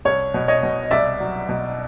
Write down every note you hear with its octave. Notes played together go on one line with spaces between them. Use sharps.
C2 C#5
B2
C#5 D#5
B2
C2 D5 E5
F#3
B2